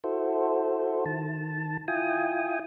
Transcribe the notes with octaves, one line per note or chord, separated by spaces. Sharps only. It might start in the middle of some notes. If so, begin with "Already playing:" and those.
E4 F#4 A4 C5
D#3 A5
E4 F4 G5 G#5 D#6